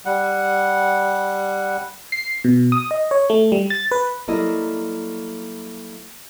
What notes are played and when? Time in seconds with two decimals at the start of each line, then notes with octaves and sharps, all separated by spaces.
0.06 G3 F#5
2.12 C7
2.44 B2
2.72 D#6
2.91 D#5
3.11 C#5
3.30 A3
3.52 G3
3.70 A6
3.91 B4
4.28 F#3 G3 A#3 E4 A4 D#5